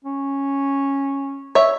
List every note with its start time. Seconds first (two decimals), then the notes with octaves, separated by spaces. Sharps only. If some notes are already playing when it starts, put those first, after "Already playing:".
0.04 C#4
1.55 C#5 E5